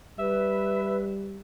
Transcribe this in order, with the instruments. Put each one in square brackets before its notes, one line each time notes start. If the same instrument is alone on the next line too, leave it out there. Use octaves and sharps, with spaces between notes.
[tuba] G3 [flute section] B4 [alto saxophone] E5